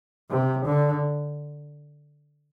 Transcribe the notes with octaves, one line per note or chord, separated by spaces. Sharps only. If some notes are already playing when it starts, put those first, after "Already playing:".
C3
D3